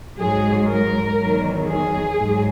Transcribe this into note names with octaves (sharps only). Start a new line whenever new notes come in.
G#2 F#3 G#4
A#4
E2 D#3 F#3
G#4
G#2 F#3